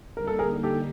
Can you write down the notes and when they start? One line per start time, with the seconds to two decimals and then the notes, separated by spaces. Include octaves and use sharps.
0.16 D3 G3 A#3 D#4 A#4
0.27 A4
0.39 G#4 A#4
0.63 G4 A4